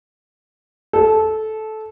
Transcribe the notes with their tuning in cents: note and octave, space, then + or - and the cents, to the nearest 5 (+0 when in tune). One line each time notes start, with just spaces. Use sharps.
A4 -15